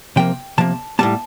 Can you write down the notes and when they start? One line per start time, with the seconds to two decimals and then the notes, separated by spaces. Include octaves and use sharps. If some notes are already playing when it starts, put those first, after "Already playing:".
0.16 C3 F3 A#3 G5
0.58 C3 F3 A#3 A5
0.99 A2 G3 A#3 A5